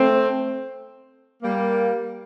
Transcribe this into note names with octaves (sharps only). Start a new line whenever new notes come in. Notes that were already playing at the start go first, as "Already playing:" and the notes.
Already playing: A3 C4
G3 A#3